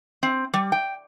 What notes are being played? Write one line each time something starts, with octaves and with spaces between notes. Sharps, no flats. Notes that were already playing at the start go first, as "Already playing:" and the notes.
C4
G3
G5